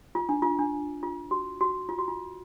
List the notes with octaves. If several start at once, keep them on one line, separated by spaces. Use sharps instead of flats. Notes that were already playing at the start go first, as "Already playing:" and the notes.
F4
D4
F4
D4
F4
F#4
F#4
F4
F#4
F4